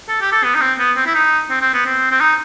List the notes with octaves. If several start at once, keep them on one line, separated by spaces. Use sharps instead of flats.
A4
G4
A4
B3
D#4
C4
B3
C4
E4
D#4
C4
C4
B3
C4
C4
D#4